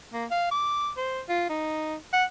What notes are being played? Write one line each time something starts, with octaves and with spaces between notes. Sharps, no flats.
A#3
F5
D6
C5
F4
D#4
F#5